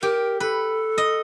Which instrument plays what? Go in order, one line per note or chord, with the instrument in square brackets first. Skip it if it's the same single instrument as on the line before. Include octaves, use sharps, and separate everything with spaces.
[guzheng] G4 [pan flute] A#4
[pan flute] A4 [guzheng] B4
[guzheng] D#5